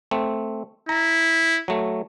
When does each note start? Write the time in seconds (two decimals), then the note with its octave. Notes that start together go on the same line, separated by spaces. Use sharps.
0.11 A3 C4
0.89 E4 A#5
1.68 F#3 A3